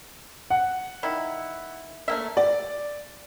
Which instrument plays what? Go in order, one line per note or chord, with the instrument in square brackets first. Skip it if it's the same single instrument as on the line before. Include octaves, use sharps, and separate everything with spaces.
[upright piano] F#5
[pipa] D#3 E4
A3 A#3 E5
[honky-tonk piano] D5